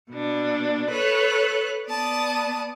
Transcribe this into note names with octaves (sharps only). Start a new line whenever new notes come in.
B2 D4
A4 B4 C#5 F#6
B3 D5 A5 D#6